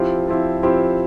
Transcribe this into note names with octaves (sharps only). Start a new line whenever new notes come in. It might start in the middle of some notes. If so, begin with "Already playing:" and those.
Already playing: F3 C4 E4 G4
F3 C4 E4 G4
F3 C4 E4 G4